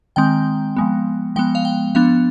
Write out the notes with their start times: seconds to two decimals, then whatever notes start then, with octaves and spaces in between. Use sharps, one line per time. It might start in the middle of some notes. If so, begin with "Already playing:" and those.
0.16 D#3 G#3 C4 G5
0.76 F3 G#3 B3
1.36 F3 G#3 B3 G5
1.55 F5
1.65 G5
1.95 F3 B3 D4 F5